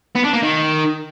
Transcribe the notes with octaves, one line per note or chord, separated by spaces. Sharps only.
B3
D4
A#3
D#3